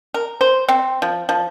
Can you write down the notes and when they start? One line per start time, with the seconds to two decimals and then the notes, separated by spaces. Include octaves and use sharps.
0.14 A#4
0.41 C5
0.69 C4
1.02 F3
1.29 F3